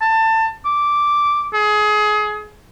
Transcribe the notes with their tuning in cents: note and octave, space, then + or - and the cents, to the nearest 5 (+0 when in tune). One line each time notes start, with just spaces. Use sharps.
A5 +25
D6 -5
G#4 +25